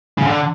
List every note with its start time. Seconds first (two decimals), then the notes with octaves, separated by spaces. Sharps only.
0.18 C#3
0.27 D3